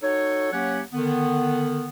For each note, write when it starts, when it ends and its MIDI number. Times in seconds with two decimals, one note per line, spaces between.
0.03 0.52 63
0.03 0.52 66
0.03 0.52 69
0.03 0.52 73
0.53 0.82 54
0.53 0.82 58
0.53 0.82 61
0.53 0.82 67
0.53 0.82 73
0.53 0.82 78
0.93 1.88 50
0.93 1.88 51
0.93 1.88 59